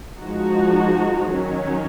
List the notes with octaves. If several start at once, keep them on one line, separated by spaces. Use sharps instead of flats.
F3 G#3 D#4 F#4
D#3 F#3 C#4